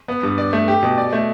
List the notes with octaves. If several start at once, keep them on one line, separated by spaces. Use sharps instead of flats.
B3
G2
D5
A3
G4
B2
D5
A3